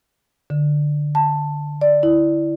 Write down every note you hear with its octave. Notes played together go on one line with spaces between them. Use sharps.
D3
A5
D5
E4